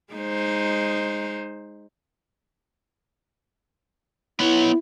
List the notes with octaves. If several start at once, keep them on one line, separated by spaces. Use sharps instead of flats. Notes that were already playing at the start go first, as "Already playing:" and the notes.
G#3 D#4 C5
B3 E4 B4 C#5